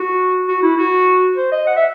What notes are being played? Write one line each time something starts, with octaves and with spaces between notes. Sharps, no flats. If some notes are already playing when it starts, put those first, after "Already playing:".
Already playing: F#4
F#4
E4
F#4
C5
D#5
F#5
E5